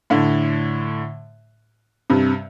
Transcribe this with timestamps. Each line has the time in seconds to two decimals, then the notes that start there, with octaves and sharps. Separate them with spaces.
0.10 A2 D3
2.10 G2 C3